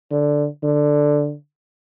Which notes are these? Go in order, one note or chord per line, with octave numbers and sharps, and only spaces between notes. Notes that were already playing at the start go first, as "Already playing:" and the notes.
D3
D3